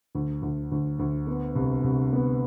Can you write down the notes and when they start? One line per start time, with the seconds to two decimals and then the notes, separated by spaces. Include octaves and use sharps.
0.15 D2
0.42 D2
0.72 D2
0.99 D2
1.27 B3
1.56 C2
1.84 C2
2.13 B3